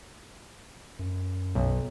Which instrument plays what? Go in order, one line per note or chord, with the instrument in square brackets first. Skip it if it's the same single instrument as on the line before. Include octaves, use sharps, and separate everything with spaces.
[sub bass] F#2
[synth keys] B1